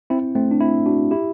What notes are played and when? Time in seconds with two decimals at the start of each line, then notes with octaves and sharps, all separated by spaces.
0.10 C4 E4
0.35 A3 C4
0.51 D4
0.61 C4 E4
0.86 D4 F#4
1.11 E4 G4